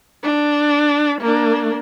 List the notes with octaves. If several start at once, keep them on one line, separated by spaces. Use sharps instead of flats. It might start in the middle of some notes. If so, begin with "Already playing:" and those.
D4
A#3 D4